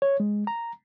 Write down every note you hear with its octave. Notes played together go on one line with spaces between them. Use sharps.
C#5
G#3
A#5